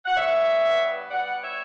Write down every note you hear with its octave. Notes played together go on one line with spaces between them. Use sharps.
F#5
G2 C#5 E5
B3
G3 D5 F#5
C#5 E5